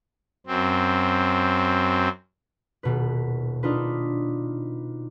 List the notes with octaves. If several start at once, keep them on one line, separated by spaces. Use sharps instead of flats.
F#2 C4
D#1 B2 B4
D4 D#4 F4 B4